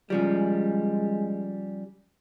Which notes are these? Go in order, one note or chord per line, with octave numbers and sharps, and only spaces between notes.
C#3 F3 G3 G#3